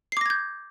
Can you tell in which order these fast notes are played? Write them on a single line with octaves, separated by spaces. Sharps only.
C7 D6 A#6 G#6 G6